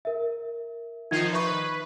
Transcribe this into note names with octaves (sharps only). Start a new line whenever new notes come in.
A#4 E5
D#3 F3 D#4 G#6 C7
B4 E5 C#6